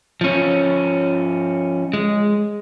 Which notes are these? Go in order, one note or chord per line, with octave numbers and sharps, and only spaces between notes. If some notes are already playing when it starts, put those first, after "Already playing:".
F3 C#4
G#3